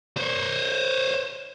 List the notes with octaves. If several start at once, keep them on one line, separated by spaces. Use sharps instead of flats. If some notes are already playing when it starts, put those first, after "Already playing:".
C5 C#5